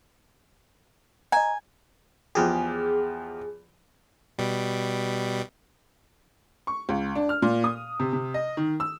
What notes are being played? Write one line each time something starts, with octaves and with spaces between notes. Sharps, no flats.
D#5 G#5 A#5
E2 F3 G4 G#4
B2 G3
C#6
C#2
D4
F6
A#2
D#6
C3
C3
D#5
D#3
E6